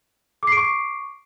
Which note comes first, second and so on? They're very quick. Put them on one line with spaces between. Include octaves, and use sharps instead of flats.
D6 C7 D7 C#6